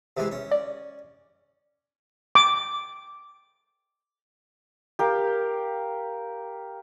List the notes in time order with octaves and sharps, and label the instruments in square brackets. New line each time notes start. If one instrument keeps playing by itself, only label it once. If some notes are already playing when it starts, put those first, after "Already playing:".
[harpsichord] C3 E3 G#3
C#4
[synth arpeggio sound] D5
[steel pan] D6
[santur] G4 A#4 F5